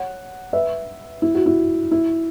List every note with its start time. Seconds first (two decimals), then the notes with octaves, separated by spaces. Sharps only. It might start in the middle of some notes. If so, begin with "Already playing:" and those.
Already playing: C#5 F#5
0.53 B4 E5
1.22 E4
1.35 F#4
1.46 E4
1.91 E4